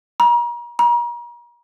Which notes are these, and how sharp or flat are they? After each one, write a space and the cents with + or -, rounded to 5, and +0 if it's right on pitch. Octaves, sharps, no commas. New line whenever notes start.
A#5 +40
A#5 +40